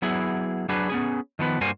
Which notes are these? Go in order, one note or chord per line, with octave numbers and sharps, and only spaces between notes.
F#3 B3 E4 G#4
F#3 D4 F#4 G#4 B4
B3 C#4 G#4
D#3 F3 B3 B4
G2 G3 A#3 F#4 C5 G#5